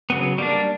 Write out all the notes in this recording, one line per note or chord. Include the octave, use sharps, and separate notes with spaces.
C#3 F#3 B3
G3 A#3 D4